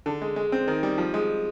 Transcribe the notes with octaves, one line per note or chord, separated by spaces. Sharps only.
D3
G#3
G#3
C4
D#3
G3
F3
G#3